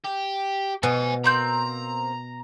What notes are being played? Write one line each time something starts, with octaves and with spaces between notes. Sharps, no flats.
G4
B2 C5 G#5
A#3 C4 A#5 G6